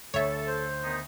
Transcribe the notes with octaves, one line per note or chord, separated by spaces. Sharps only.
D2 A4 C#5 E5 C#6
C5
D#3 B3 D#4